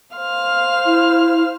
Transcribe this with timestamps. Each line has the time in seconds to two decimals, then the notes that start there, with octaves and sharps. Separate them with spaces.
0.16 C5 F5 F6
0.85 E4